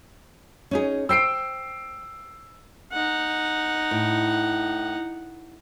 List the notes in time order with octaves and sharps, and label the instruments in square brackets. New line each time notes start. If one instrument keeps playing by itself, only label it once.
[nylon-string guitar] C#4 D#4 G#4
[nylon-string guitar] C5 G5 [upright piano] E6 C7 D7
[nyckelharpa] D#4 F#5
[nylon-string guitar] A2